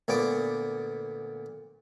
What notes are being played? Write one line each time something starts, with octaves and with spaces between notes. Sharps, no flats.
D2 A#2 B3 D5 D6